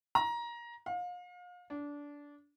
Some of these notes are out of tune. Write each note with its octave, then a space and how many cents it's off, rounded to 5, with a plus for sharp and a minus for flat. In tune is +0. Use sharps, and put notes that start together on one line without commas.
A#5 +20
F5 +35
D4 -20